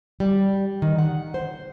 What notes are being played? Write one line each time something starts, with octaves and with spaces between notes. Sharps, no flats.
G3
D#3
F#5
C5